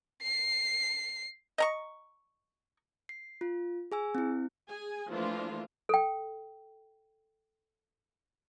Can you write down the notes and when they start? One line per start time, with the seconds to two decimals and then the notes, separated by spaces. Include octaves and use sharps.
0.23 C7
1.58 D#5 A#5 C#6
3.09 C7
3.41 F4
3.92 G#4 G#5 E6
4.15 C4 E4
4.68 G#4 G#5
5.10 E3 F3 A3 A#3 D4 F4
5.89 A4 G5